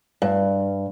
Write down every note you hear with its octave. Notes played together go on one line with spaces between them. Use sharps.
G2